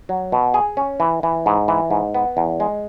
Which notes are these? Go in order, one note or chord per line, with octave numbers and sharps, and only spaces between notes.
F#3
B2
G#4
C#4
E3
E3
G#2
E3
G#2
B3
E2
G#3